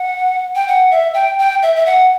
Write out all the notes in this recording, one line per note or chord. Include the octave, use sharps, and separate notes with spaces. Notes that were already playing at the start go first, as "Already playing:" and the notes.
Already playing: F#5
G5
F#5
E5
G5
G5
E5
E5
F#5